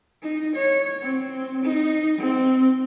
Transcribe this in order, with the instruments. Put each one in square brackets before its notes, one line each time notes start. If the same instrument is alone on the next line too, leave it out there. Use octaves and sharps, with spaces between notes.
[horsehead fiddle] D#4
C#5
C4
D#4
C4